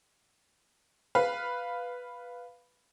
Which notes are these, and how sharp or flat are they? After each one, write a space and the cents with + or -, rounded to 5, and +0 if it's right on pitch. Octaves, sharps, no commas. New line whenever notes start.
B4 +0 F5 +0